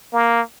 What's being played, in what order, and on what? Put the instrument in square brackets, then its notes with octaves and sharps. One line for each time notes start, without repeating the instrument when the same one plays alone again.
[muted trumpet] A#3